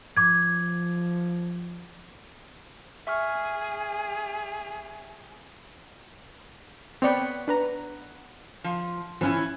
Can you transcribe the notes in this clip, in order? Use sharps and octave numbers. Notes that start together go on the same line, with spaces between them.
F3 D6 G#6
G#4 E5 C#6 F6
B3 C4 C#5 D5 G5
D4 B4 A#5
F3
G#1 E3 F3 C#4 E4